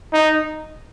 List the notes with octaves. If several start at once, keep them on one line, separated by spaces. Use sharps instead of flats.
D#4